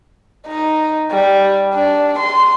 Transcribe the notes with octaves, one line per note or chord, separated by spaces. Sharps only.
D#4
G3
D4
C6